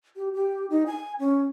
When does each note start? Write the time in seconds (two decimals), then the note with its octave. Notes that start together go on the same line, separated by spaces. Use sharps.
0.16 G4
0.34 G4
0.70 D#4
0.87 G#5
1.19 C#4